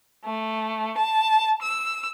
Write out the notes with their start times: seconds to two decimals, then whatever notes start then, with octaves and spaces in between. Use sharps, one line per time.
0.25 A3
0.99 A5
1.61 E6